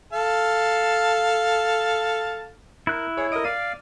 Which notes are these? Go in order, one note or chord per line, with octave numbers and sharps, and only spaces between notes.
A4 F5 A5
E4 A#4 F#6
G#4 C#5
A#4 D#5 D#6 D7
D5 F5 D#7